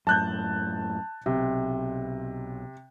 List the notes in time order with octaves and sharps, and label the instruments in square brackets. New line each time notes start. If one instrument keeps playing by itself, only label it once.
[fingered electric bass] F#2 A2 [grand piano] A5 F#6 G6
[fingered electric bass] B1 [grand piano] C3